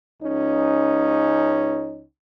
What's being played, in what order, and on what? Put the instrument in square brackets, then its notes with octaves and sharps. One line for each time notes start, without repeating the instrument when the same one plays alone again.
[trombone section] C#2 C#4 D#4